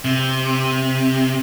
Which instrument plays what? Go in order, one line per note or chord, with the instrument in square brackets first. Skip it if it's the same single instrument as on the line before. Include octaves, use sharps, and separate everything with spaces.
[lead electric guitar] C3